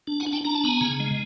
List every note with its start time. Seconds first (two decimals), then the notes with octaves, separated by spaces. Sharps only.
0.07 D4
0.20 F#5 G#5
0.26 D4
0.32 G5 A5
0.45 D4 A#5
0.55 A5
0.64 B3 G#5 A#5
0.81 C#3
1.00 G#3